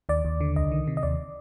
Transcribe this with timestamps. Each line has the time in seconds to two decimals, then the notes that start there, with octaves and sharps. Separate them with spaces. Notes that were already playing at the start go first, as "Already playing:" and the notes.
0.09 D#2 D5
0.25 D#2
0.41 D3
0.56 C2 D#5
0.72 D#3
0.87 C3
0.97 D#5
1.03 D#2 D5